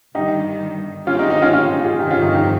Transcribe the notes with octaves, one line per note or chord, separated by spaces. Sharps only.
G1 G2 D#3 D#4 G4
A#2 G#3 C4 C#4 F4 G4
D#4
D#4
C#4 F4
C#4 F4
F4 G#4
G1 F2 C3 D#3 D#4 G4
C#4 F4
D#4 G4
D#4 G4